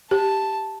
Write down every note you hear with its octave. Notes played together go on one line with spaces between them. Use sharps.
G4 A5